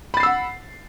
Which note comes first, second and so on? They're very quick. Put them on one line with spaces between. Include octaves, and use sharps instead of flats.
B5 A6 C7 E6 F#5